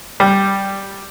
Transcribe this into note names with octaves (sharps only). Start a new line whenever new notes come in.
G3